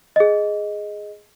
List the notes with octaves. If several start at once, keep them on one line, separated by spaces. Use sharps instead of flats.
G#4 D#5